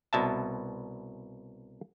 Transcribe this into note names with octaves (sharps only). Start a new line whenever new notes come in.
C2 B2 E5 A5